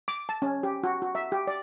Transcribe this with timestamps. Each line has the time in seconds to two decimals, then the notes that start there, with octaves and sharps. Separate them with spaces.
0.08 D6
0.29 A5
0.42 C#4
0.63 G4
0.83 F#4
1.02 F#4
1.15 E5
1.32 G4
1.47 D5